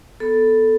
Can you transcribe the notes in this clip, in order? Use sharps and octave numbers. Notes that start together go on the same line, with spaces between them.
B3 A4